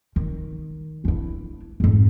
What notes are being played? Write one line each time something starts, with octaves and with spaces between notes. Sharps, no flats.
D#3
D4 E4
F2 G#2